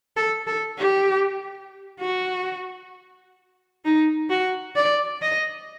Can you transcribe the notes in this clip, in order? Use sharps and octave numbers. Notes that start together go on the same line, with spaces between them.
A4
A4
G4
F#4
D#4
F#4
D5
D#5